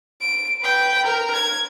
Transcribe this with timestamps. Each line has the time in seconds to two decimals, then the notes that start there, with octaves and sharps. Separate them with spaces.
0.21 D7
0.61 B4 G5
1.03 A#4
1.34 G#6